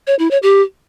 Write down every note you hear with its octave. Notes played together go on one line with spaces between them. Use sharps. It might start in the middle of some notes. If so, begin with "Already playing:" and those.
C#5
E4
C#5
G4